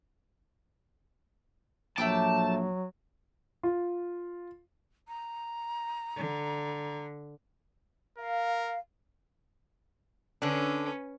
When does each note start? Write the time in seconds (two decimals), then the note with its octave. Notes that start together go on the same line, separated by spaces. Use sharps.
1.98 A#1 F#3 A3 G5 A5 D6
3.63 F4
5.08 A#5
6.16 D3
8.18 A#4 F5
10.42 D3 C#4 D4 B4